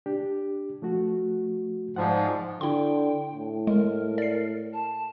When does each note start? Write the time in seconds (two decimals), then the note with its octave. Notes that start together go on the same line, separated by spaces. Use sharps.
0.06 D4 G4
0.82 F3 A3 F#4
1.96 G#2 F3 D5 F#5
2.61 D3 E4 G5 C6
3.33 A2
3.67 G#3 A#4
4.18 D5 C7
4.73 A5